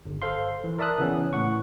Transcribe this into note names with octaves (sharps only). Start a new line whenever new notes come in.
G1
A4 C5 F5 C6
E3
A#4 D5 E5 A5 D#6 F#6
C#3 E3 B3 C#4
A2 F#5 C#6